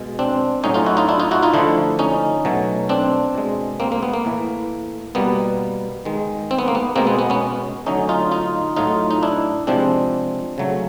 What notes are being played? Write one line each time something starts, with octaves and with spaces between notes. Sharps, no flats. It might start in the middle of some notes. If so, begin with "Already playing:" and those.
Already playing: B2 G#3
C4 D4
A2 F#3 A3 C#4 D#4
D#4 F4
E4 F#4
D#4 F4
D4 E4
D#4 F4
E4 F#4
D#4 F4
D3 F3 A3 D4 E4
C#4 D#4
B2 F#3 A3
C4 D4
B2 G#3
A#3 C4
A#3
B3
A#3
A2 E3 A3
B2 G3 A#3 B3
D#3 G#3
C4
B3
A#3
B3
B2 G#3 A#3 C4
B3
B3
B3 C#4
D3 F#3 A3 C#4 D#4
D#4 F4
D#4 F4
A2 F#3 A3 D#4 F4
D#4
D4 E4
C3 F3 G#3 C4 D4
C#3 F#3 A3